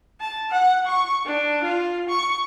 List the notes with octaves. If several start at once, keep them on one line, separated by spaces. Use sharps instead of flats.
A5
F#5
C#6
D4
F4
C#6